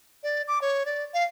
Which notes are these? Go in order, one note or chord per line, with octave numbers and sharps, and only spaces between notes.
D5
D6
C#5
D5
F5